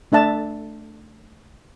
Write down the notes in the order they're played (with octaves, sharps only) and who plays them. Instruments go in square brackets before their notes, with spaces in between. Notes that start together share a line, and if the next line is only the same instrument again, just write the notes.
[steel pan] A3 D4 E5 A5